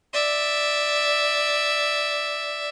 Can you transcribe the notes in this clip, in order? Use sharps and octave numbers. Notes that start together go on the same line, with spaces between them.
D5 E5